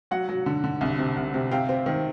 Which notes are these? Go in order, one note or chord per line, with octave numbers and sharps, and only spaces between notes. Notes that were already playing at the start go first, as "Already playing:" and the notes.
F#3 F#5
F#3
D3
D3
C2
C3
C2
C3
C3 F5 G5
C4
D#3